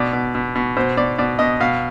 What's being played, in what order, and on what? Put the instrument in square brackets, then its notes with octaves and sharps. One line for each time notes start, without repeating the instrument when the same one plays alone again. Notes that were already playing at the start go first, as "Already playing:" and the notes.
Already playing: [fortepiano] B2 D5
B2
B2
B2
B2 C5
B2 D5
B2 D5
B2 D#5
B2 F5